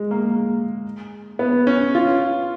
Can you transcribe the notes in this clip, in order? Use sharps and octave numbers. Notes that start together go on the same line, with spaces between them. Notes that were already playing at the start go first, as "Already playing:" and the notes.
Already playing: G#3
A#3
A#3
B3
C#4
F4